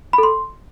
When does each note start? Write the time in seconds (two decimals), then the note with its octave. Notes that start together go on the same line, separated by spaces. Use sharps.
0.13 B5
0.18 A4
0.23 C6